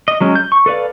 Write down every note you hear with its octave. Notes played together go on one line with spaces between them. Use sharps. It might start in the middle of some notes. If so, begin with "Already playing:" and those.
D#5
F#3 G#3 C#4
G6
C#6
A4 B4 D5 F5